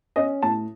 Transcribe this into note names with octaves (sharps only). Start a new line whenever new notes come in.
C#4 D#5
A2 A5